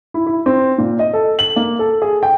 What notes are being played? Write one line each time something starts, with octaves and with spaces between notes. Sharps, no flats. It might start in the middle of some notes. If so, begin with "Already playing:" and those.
E4
E4
C4
A#2
D#5
A4
F#7
A#3
A4
G#4
G5